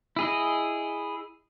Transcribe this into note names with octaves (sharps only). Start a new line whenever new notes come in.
E4 G#4 D#5